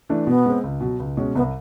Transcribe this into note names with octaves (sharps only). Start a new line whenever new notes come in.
E3 A3 D4
B2 B3
G#3 C4
C#2
B2 F#3
C#2
B2 G#3 C#4
C2 B3